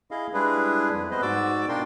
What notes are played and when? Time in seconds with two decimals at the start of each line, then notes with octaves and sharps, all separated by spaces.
0.11 E4 G#4 D#5 F5
0.33 G3 G#3 D4 E4 G#4 B4
0.92 F2
1.11 G3 B3 B4 C5 D#5
1.22 G#2 F#4 D5 D6 E6
1.69 B2 D4 F4 A#4 G5 C6